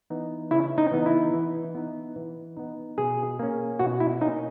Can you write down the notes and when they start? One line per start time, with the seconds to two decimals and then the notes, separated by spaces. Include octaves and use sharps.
0.10 E3 B3 D#4
0.51 C#3 E4
0.78 D#4
0.92 E3 B3 D#4
1.06 E4
1.33 E3
1.75 B3 D#4
2.16 E3
2.57 B3 D#4
2.98 B2 G#4
3.39 A#3 C#4
3.79 B2 F#4
4.00 E4
4.21 A#3 C#4 D#4